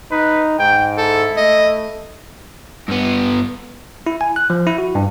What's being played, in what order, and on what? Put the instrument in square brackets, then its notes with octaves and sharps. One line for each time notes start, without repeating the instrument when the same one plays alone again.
[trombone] D#4 [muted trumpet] B4
[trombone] G#2 [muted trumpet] G5
[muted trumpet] E4 [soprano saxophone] A4
[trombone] A3 [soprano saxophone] D#5
[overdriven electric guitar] G2 B3
[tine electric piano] E4
G#5
F#6
F3
E4
F#4
G2